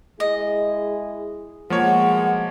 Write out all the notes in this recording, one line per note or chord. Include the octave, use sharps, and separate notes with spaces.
G#3 E4 G#4 D#5
B2 F3 G3 G#3 A#3 C#5 F#5